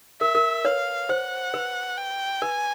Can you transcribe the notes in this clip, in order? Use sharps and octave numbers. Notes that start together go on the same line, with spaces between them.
A#4 E5
A#4
B4 C#5 F5
C5 F#5
B4
G5
B4 G#5